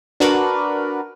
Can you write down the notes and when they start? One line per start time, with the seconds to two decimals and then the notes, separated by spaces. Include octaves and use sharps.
0.20 D4 F#4 A#4 B4 D5